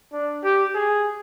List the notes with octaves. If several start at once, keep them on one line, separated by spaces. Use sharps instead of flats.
D4
G4
G#4